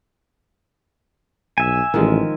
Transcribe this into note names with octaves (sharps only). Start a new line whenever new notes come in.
B1 E5 G#5
A1 D#3 F3 G#3